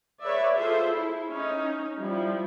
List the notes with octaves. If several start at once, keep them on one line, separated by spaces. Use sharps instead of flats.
G#4 B4 C#5 D5 E5
F4 G#4 A4 C5 E5
E4
C#4 D#4
F3 G3 E4